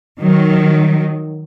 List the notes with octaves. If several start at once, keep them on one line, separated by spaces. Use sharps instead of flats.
D#3 F#3